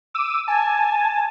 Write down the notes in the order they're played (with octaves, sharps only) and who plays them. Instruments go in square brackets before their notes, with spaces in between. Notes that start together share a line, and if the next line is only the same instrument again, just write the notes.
[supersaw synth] D6 E6 D#7
[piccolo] G#5 [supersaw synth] A5